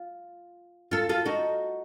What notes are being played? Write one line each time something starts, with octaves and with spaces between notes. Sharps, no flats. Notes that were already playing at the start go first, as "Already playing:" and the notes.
Already playing: F4
F4 A4
F4 A4
D#4 F#4